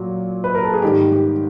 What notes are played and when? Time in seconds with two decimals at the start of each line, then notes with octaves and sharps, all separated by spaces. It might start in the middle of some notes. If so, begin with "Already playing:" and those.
Already playing: A#2 F#3
0.44 B4
0.55 A#4
0.63 A4
0.74 G#4
0.82 G#2 D#3 G3 G4
1.12 G4